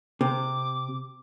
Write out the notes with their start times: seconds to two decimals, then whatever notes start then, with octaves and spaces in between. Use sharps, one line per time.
0.21 C3 D6